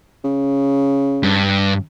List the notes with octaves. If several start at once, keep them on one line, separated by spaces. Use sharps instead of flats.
C#3
G2